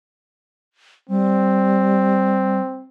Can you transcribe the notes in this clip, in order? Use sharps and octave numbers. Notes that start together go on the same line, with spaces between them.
G3 C4